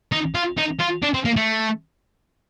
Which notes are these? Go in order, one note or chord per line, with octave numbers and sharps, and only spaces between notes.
D#4
F4
D#4
F4
D4
C4
A#3
A3